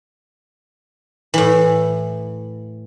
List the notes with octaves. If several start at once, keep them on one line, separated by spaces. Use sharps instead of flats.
A2 E3